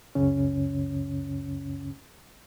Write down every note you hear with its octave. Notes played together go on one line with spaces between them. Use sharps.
C#2 F#2 C#3 C#4